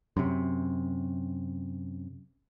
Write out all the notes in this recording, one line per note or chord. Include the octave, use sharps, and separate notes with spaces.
F#2 C3